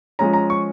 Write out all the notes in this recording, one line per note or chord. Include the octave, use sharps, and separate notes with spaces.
F3 G#3 C#4 A#5
A#5
C#6